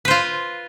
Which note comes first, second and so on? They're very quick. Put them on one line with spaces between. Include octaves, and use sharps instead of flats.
B4 C5 F4